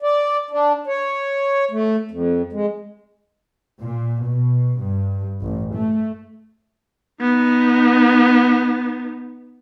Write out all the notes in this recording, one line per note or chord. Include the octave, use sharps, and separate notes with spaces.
D5
D4
C#5
A3
F2
G#3
A#2
B2
G2
A1
A3
B3 D#4